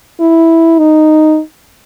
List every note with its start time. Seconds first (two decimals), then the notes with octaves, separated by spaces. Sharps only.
0.20 E4
0.78 D#4